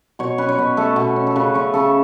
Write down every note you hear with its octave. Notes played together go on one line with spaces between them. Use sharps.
B2 C#5
C#4 B4
C#5
B2 B4
A3 A4
B2
C#4
A4
C#3 B4
C#4 C#5
C#3 A4